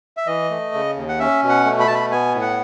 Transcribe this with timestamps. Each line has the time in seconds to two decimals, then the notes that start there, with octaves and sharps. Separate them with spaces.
0.17 E5
0.27 E3 D#5
0.50 A3
0.74 C#3
0.96 D#2
1.09 F#5
1.20 C#4 E5
1.43 B2
1.49 F#5
1.65 A3
1.80 B5
1.87 B2 A5
1.95 B5
2.12 B3 G#5
2.34 A2
2.42 F#5